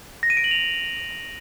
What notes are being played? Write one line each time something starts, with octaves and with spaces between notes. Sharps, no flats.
A#6
D#7
D7
F#7
F7